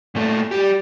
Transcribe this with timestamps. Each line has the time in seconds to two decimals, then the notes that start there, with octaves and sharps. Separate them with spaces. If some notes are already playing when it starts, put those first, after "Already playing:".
0.15 A#2 A3
0.51 G3 G4